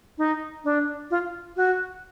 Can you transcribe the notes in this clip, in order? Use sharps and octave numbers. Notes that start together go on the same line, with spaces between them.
D#4
D4
F4
F#4